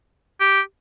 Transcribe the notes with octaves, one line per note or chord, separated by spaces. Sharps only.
G4